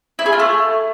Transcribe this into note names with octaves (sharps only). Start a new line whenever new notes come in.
E4
G#4
F4
A3